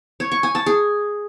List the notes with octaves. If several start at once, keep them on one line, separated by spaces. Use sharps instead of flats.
C#5
C#6
G#5
A5
G#4